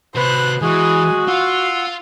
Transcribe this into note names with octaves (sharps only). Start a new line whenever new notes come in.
C3 F#4 B4 C5 F#6
E3 G#3 F#4 G#4 G#5
F4 F5 F#5 E6